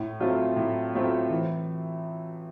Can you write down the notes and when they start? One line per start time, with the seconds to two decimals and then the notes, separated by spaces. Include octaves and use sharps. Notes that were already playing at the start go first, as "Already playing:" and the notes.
Already playing: A2
0.20 F#3 A3 C4 F4
0.56 A2
0.94 F#3 A3 C4 F4
1.30 E3